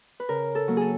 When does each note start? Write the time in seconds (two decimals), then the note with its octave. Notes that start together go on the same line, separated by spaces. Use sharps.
0.20 B4
0.29 C#3 A#4
0.55 A4
0.68 F#3 A#3
0.77 G#4 A4